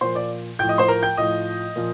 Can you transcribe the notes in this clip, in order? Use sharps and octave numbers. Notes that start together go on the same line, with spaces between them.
A#2 F3 C5 C6
D5 D6
A2 F3 G5 G6
D#5 D#6
C5 C6
A#4 A#5
G5 G6
A2 F3 D#5 D#6
A#2 F3